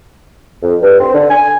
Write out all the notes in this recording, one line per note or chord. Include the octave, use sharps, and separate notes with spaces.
F2
G2
C4
D3
G#5